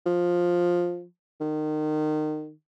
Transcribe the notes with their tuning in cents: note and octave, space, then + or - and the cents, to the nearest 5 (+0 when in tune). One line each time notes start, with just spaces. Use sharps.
F3 +10
D#3 -25